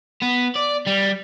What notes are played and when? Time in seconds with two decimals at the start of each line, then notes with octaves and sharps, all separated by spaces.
0.22 B3
0.55 D5
0.86 G3